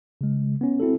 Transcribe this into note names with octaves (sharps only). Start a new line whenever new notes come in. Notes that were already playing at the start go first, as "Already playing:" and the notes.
C#3 G#3
B3 C#4
C4 E4 F#4 A4